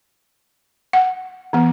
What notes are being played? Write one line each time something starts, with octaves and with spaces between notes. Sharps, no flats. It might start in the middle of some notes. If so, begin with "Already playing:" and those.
F#5
E3 B3